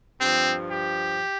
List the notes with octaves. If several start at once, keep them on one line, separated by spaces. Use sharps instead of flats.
G2 F3 C4
G4